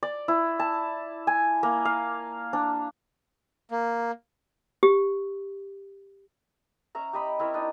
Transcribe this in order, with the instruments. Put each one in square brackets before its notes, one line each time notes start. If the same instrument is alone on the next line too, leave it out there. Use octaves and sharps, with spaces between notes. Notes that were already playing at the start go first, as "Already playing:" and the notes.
[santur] D5
E4
A5
G#5
A#3
F5
D4
[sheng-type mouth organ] A#3
[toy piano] G4
[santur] C#4 E5 A#5
G4 D#5 B5
C4 E4 A#4 C#5
D4 D#4 D#5